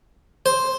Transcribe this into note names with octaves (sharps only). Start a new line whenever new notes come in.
C5